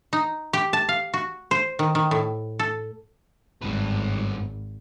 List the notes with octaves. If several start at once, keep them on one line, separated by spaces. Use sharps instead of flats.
D#4
G4
A5
F5
F#4
C5
D#3
D#3
A2
A4
G#1 G2 B3